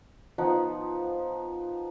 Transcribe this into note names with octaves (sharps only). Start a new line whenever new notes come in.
F3 B3 D#4 F#5